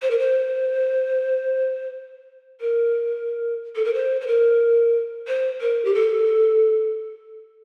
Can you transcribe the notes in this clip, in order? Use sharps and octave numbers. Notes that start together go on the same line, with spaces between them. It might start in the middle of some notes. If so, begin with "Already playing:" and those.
C5
A#4
C5
A#4
A4
A#4
C5
C5
A#4
C5
A#4
G4
A4